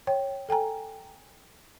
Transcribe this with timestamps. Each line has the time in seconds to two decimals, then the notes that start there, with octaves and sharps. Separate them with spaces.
0.07 C#5 G5
0.49 A4 G5 G#5 A#5